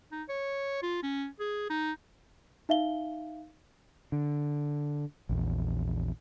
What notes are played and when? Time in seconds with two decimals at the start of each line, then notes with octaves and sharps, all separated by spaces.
0.12 D#4
0.29 C#5
0.82 F4
1.02 C#4
1.40 G#4
1.70 D#4
2.69 D#4 E5 F5 G7
4.12 D3
5.29 A#1 E2